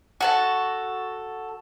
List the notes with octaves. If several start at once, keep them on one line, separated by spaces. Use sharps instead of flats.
F#4 A4 A5